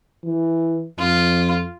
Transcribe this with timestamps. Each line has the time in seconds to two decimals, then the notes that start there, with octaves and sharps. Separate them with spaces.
0.24 E3
0.98 F2 F4